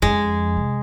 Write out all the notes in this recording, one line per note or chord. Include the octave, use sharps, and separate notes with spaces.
F2 G#3 C#4
C3